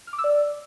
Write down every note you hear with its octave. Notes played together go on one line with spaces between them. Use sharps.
F6
D6
E6
D5